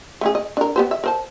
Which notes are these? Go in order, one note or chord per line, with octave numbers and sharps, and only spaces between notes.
A3 C#4 G#4
D#5
D4 A#4
B3 G4 C5
E5
A#4 C5 A5